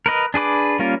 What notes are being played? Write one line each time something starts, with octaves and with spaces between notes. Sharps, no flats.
A#4 B4 D#5
D4 G#4 B4 D6
G3 A#3 C#4 F4 A#4